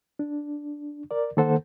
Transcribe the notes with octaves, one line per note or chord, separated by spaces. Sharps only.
D4
A#4 D5
D#3 A#3 A4 C5 F#5